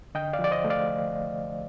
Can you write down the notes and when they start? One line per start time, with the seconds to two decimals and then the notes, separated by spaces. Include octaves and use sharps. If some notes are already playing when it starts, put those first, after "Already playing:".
0.15 D3 D#5 G5
0.33 D5 F5
0.39 F3
0.44 D5
0.51 C5 D#5
0.64 A3
0.70 D5 F5